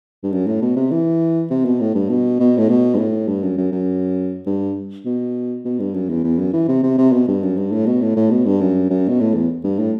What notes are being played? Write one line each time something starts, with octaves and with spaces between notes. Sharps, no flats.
G2
F#2
A2
B2
C3
E3
C3
B2
A2
G2
B2
B2
A2
B2
G2
A2
G2
F#2
F#2
F#2
G2
B2
B2
G2
F#2
E2
E2
F#2
E3
C3
C3
C3
B2
G2
F#2
G2
A2
B2
A2
A2
B2
G2
F#2
F#2
B2
A2
E2
G2
A2